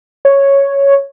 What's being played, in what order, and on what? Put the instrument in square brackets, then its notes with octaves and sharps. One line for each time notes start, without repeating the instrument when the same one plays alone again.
[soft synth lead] C#5